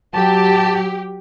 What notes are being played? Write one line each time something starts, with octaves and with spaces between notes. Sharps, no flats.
F#3 G4 A5